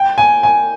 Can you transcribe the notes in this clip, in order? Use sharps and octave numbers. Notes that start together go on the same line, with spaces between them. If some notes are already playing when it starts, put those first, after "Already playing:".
Already playing: G5
G#5
G#5